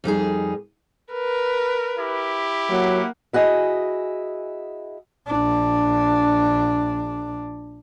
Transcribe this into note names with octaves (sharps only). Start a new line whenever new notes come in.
F2 G3 D#4 G#4
A#4 B4
E4 G4
F#3 A#3 F#5
E4 F#4 G#4 D#5
A#1 D4